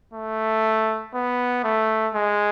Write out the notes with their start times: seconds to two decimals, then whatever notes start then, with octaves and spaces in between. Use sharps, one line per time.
0.14 A3
1.14 B3
1.64 A3
2.14 G#3